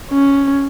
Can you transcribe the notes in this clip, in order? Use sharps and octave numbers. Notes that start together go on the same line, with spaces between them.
C#4